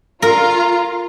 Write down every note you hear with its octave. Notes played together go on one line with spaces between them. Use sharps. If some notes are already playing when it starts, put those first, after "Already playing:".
F4 A#4 A#5